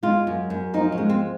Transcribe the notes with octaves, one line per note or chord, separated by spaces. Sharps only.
G#3 F4
F#2
F#2
F3 D#4
C#4
G#3
C4